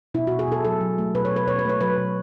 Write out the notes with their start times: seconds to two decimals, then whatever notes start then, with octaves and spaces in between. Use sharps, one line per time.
0.14 B2 E4
0.27 F#4
0.31 B2
0.39 G#4
0.48 B2 A4
0.65 F#3 A4
0.81 F#3
0.98 A3
1.15 B2 B4
1.25 C#5
1.31 B2
1.36 B4
1.47 B2 C#5
1.59 B4
1.65 A3 C#5
1.81 F#3 B4
1.98 B2